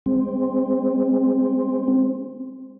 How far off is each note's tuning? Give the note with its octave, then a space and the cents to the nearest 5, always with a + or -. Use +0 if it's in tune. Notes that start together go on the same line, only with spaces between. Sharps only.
G#3 -25 C4 +0